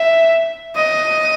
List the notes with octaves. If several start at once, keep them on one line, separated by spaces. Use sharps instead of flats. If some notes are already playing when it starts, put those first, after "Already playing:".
Already playing: E5
D#5